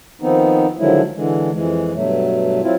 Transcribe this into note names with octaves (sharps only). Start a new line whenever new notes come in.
D#3 F3 B3 C4 D#4
D3 D#3 F3 F#3 G#3 E4
D3 E3 G#3
F2 E3 G#3
G2 B2 F#3 A3
F#3 C4 E4 F4